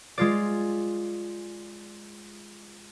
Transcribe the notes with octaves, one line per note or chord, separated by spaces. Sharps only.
G#3 F4 D5